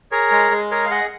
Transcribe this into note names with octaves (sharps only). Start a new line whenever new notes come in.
G#4 A#4 C#5
G#3
G#3
G#4 A#4 C#5
F5
G#4 D#5 F#5